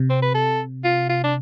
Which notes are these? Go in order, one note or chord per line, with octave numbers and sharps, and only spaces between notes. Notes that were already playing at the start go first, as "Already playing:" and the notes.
Already playing: C3
C4
B4
A4
F4
F4
D4